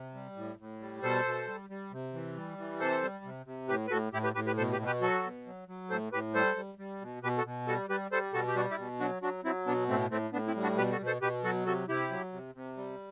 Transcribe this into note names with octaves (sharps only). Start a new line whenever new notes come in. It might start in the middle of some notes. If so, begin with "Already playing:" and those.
Already playing: C3
G3
A2
A2
G3
B2 A4 C5
B2
G3
G3
C3
E3
G3
E3
C3 A4 C5
G3
C3
C3
A2 G4 B4
B4
A2 F#4 A4
A2 E4 G4
G4 B4
A2 G4 B4
G4 B4
B2 A4 C5
G4 B4
B2
G4 B4
F#3 F#4 A4
B2
F#3
F#3
A2 A4 C5
A2 G4 B4
G3 A4 C5
G3
G3
B2
B2 G4 B4
F#4 A4
B2
G3 F#4 A4
G3 G4 B4
G3 A4 C5
B2 F#4 A4
G4
G3 D4 F#4
E4 G4
B2
F#3 D4 F#4
F#3 D4 F#4
F#3 C4 E4
B2 B3 D4
A2 A3 C4
A2 A3 C4
A2 B3 D4
C4 E4
G3
D4 F#4
B2 G4 B4
F#4 A4
B2
A4 C5
B2 G4 B4
F#3 F#4 A4
C3 F#4 A4
C3 E4 G4
F#3
C3
C3
G3